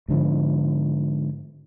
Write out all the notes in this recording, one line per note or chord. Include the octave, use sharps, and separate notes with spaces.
G#2 D3 F3